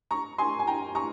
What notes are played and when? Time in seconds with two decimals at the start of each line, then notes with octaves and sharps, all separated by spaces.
0.11 A#5 C#6
0.38 G#5 C6
0.59 G#5
0.67 G5 A#5
0.95 A#5 C#6